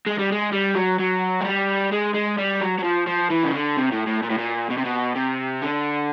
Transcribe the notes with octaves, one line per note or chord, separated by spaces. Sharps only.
G#3
G3
G#3
G3
F#3
F#3
G#3
G3
G#3
G#3
G3
F#3
F#3
F3
F3
E3
C#3
D3
C3
A2
A2
A#2
A2
A#2
B2
C3
B2
C3
D3